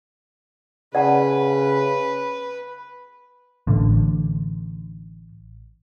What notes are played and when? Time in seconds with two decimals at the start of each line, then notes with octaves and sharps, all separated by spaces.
0.95 C#3 B4 D5 F#5 A5
3.67 A1 D3